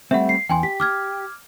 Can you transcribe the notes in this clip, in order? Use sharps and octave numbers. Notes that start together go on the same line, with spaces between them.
G3 A3 C4 E5 F#5
C7
E2 G5 G#5 C6
G4 B6
D6 F6 G#6